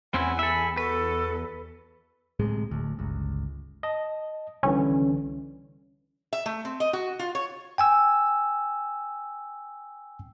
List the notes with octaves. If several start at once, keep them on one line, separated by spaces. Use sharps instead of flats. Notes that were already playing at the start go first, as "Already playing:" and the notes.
E2 C4 C#4 E4 F#5 G#5
A4 E5 B5
F#4 A4 B4
D1 A2 C3 G#3
D1 D2
G1 C#2
D#5 A5
C2 D3 E3 C#4
E5
A3
C4
D#5
F#4
F4
C#5
G5 G#5 E6